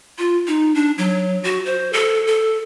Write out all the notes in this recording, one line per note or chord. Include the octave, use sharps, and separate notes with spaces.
F4
D#4
D4
F#3
F#4
C5
A4
A4